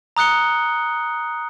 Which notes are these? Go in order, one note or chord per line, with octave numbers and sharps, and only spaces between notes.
A#5 D#6 F#6 C#7 G7